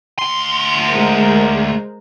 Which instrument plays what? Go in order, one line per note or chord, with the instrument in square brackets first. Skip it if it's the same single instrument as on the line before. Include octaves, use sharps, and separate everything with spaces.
[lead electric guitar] D2 C6
[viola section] G#3 A#4 C5